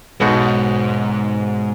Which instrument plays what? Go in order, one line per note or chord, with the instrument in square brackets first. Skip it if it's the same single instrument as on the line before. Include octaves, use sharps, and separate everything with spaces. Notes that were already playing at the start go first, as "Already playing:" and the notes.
[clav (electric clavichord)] B1 B2 G#3 D#4 F#4 [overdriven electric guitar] G#2